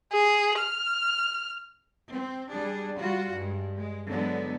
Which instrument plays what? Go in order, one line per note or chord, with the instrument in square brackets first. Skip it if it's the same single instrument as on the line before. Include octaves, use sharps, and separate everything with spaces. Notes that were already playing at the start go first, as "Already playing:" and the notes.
[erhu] G#4
F6
[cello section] C4
G3 D4 G#4
G3 F4 F#4
G2 G#3
G#3
D3 F#3 G#3 B3